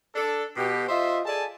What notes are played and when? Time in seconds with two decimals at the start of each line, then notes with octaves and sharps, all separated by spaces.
0.14 D4 A4
0.57 B2 G4
0.89 F4 C5 D#5 E5
1.26 G#4 A4 D5 G#5 A5